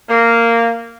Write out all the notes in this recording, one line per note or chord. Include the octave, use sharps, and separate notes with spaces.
A#3